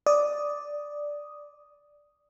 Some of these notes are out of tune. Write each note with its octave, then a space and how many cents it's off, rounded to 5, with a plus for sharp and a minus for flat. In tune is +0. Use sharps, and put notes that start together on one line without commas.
D5 +0 D#6 +0